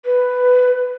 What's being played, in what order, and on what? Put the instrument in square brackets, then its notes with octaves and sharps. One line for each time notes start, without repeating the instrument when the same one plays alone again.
[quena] B4